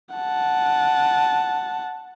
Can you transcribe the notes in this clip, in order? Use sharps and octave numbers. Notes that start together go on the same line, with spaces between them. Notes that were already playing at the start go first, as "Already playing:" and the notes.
F#5 A5